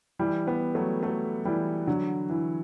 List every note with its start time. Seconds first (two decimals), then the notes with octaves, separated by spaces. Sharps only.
0.19 E3 G3
0.47 G3 B3
0.75 F#3 A3
1.03 F#3 A3
1.45 E3 G3
1.87 D3 F#3
2.29 E3